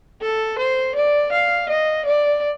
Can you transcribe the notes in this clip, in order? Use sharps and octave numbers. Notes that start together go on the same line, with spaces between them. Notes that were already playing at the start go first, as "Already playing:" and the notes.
A4
C5
D5
F5
D#5
D5